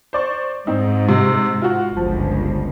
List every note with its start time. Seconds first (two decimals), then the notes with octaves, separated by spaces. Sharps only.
0.13 C5 D5 C#6
0.67 G#2 C4 D#4
1.09 C3
1.62 F4 F#4
1.97 G1 C#2 F3